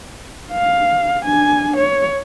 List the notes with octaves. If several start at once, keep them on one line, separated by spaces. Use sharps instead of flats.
F5
D4 G#5
C#5